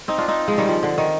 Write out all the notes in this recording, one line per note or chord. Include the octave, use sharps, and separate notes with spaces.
C4 D#4
D4 F4
C4 D#4
F3 G#3
D#3 G3
F3
D3
D#3